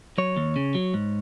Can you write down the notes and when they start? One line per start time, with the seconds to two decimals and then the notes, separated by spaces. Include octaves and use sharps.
0.18 F#3 C#5
0.37 D#2
0.56 C#3
0.75 F#3
0.94 G#2